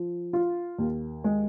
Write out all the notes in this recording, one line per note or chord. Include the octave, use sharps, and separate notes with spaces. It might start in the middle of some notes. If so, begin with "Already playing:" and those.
Already playing: F3
F4
D#2
G#3